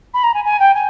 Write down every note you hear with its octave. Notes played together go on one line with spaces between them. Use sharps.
B5
A#5
G#5
G#5
G5
G#5